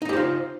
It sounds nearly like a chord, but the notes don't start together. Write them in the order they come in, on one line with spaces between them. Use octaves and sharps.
D#4 D#5 G4 C5 F4